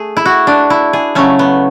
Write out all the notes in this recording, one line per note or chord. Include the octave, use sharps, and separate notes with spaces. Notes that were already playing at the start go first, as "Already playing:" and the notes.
Already playing: A3 G#4
E4
F#4
D4
E4
G#4
C#3 F#3 A3 C#4
B3